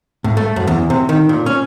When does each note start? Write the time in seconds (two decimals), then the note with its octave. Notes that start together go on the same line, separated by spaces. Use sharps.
0.24 A2
0.37 A3
0.56 F#2
0.67 E2
0.90 C3
1.09 D#3
1.29 A#2
1.46 C#4